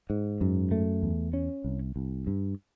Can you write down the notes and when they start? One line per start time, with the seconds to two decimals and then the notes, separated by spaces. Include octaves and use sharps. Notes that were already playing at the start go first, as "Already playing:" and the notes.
0.10 G#2
0.41 F#2
0.71 A3
1.03 E2
1.33 C#4
1.64 C2
1.96 C2
2.27 G2